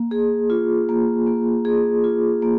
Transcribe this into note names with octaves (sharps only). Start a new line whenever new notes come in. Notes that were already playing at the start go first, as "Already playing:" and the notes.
Already playing: A#3
G#4
F4
A#3
A#3
G#4
F4
A#3